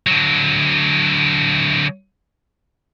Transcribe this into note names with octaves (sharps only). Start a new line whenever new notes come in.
D3 F#3